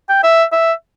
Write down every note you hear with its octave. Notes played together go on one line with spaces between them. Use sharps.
G5
E5
E5